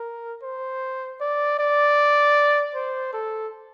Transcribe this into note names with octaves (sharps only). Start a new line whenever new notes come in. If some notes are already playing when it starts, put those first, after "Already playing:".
Already playing: A#4
C5
D5
D5
C5
A4